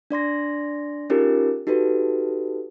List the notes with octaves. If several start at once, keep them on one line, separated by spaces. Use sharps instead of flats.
D4 D5 C6 A#6
C#4 D#4 F4 G4 G#4 A#4
D#4 F#4 G4 A4 B4